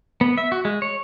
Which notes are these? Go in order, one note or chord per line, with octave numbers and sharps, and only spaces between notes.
B3
E5
F#4
G#3
C#5